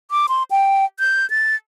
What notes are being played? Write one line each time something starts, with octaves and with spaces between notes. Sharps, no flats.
D6
C6
G5
G6
A6